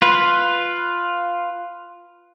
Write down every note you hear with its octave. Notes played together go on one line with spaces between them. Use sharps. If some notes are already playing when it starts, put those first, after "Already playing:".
F4 B4